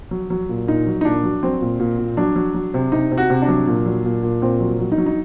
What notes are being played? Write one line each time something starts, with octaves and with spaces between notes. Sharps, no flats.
F#3
F#3
A#2
A#2 D#4
F#3
D#4
A#2 D4
F#3
F#3 C4
A#2
A#2
A#2
F#3 D4
F#3
F#3
C3
C3 D#4
C3
F#4
C3
D4
F#3
A#2
F#3
A#2
A#2
A#2 C4
F#3
F#3
D#4
F#3
D#4